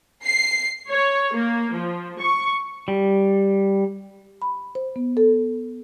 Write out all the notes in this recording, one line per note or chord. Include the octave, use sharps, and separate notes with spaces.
C7
C#5
A#3
F3
C#6
G3
B5
C5
B3
A4